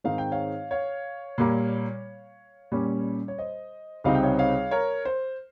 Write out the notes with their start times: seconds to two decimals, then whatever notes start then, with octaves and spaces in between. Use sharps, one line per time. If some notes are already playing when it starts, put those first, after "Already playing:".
0.04 G#2 D#3 G#3 C4 D#4 F5
0.18 G5
0.31 C#5 F5
0.71 C#5 F5
1.38 A#2 G3 A#3
2.72 A#2 G3 C#4
3.28 C#5
3.38 C5 D#5
4.04 C#2 C3 G3 C4 D#4 F5
4.15 G5
4.23 C#5 F5
4.39 C#5 F5
4.71 A#4 C#5
5.05 C5